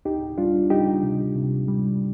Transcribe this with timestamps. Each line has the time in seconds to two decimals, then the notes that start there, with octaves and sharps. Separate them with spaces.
0.05 D2 D#4 G4
0.38 G3 D4 F4
0.70 G3 D#4 G4
1.03 C3
1.35 C3
1.68 G3